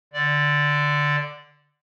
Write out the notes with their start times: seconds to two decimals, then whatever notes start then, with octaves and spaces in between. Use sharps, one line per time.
0.13 D3 D5